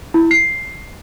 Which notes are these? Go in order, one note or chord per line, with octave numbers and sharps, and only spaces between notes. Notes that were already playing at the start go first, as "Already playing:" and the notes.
E4
C7